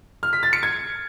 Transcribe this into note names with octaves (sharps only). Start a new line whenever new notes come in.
F6
B6
A6
C#7
G#6